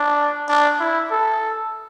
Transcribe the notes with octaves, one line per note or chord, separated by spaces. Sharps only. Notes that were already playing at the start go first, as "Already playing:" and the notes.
Already playing: D4
D4
E4
A4